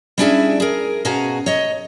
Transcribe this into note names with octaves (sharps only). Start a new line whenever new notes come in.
G3 C#4 D4 E4 G#4 E5
G#4 A#4
B2 C#4 F#4 G#4 F5 A#5
C#5 D#5